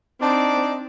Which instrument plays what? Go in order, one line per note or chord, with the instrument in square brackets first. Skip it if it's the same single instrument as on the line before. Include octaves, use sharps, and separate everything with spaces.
[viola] C4 [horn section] D4 D#4 D5